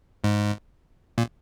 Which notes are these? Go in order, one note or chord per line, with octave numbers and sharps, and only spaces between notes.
G#2
A#2